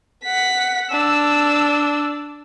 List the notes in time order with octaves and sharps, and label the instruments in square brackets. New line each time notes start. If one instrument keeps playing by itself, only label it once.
[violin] F#5 B6
[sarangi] D4 [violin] E6